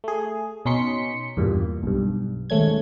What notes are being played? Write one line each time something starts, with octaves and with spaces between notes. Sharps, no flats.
A3 G#4
B2 C#4 D#4 C6 B6 C#7
E2 G2 A#2
B1 G2
D#2 G#2 A3 C#4 G#6